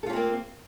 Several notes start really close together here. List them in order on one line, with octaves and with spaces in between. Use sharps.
A4 F4 C#4 C4 A#3